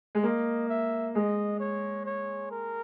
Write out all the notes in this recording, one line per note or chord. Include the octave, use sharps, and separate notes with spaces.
G#3
A#3 D#5
E5
G#3 D#5
C#5
C#5
A#4